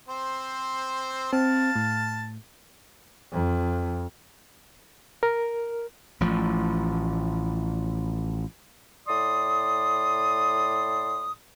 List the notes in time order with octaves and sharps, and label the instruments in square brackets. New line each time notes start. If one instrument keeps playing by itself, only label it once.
[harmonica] C4 C5
[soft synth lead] C4 [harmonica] F5 A5
[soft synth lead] A2
[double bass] F2
[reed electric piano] A#4
[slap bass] A1 A2 F3
[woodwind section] A2 D5 C6 D#6